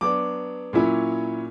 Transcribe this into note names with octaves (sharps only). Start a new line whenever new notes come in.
F#3 B3 D4 D6
A#2 F#3 C#4 E4